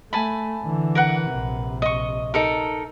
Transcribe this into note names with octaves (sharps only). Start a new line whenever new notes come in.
A3 G#5 A5 B5
D3 E3
A#4 B4 F#5
A#1 C3
D#5 C#6
D#4 A4 A#4